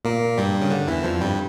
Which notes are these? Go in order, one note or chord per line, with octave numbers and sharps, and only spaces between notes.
A#2 A#3
G2 G3
C#3
D3
E2 E3
F2 F3
G2 G3